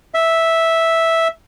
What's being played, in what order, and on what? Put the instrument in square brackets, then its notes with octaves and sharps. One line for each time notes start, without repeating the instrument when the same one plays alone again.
[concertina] E5